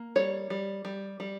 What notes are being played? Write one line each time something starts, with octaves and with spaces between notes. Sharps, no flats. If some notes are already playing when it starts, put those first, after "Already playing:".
Already playing: A#3
G3 C#5
G3
G3
G3